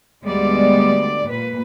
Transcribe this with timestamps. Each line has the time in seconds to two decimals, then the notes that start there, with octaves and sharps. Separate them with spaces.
0.24 D2 G3 G#3 B3 D5
1.28 A#2 B4